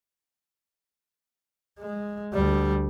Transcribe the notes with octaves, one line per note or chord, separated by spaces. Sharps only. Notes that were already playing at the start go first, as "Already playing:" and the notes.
G#3
D2 G3